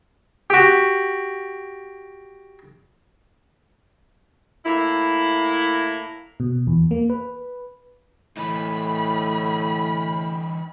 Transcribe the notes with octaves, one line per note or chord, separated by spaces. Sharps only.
F#4 G4
A2 A#3 E4
B2
E2
A#3
B4
A2 E3 D#4 B5